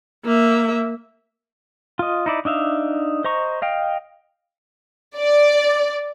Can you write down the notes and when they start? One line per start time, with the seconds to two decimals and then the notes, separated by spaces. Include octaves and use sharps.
0.25 A#3 E5
1.99 F4 D#5
2.26 D#4 E4 D5
2.45 D4 D#4 E5 F5
3.24 C5 D#5 A#5 C#6
3.62 D#5 F5 G5
5.17 D5